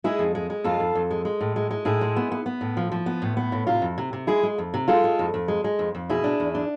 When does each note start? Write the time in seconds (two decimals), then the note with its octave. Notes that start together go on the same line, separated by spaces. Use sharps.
0.04 G#3 E4 G#4
0.19 F2
0.35 G#3
0.50 G#3
0.64 F2 F4 A4
0.80 F2
0.95 F2
1.11 G#3
1.25 G#3
1.41 A2
1.56 G#3
1.71 G#3
1.85 A2 E4 G#4
2.01 G#3
2.16 B3
2.32 B3
2.46 B3
2.61 A2
2.77 F3
2.92 F3
3.06 B3
3.22 A2
3.37 B3
3.52 A2
3.67 C3 F4
3.82 F2
3.98 C3
4.13 C3
4.27 G#3 E4 G#4
4.43 G#3
4.58 F2
4.74 C3
4.88 G#3 F4 A4
5.04 G#3
5.19 F2
5.34 F2
5.48 G#3
5.64 G#3
5.79 F2
5.95 F2
6.09 B2 E4 G#4
6.24 D4
6.40 E2
6.55 D4